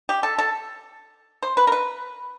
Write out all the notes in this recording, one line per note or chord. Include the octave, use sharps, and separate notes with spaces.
G4
A4
A4
C5
B4
A#4
B4